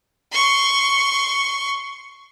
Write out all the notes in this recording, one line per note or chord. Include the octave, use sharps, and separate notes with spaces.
C6 C#6